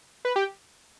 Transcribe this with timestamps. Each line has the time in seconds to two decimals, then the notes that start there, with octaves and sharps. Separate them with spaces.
0.25 B4
0.36 G4